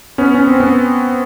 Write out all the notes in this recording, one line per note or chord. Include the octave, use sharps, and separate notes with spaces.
B3 C#4
C#4
C4
B3 C#4